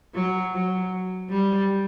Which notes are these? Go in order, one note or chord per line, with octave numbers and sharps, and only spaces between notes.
F#3
F#3
G3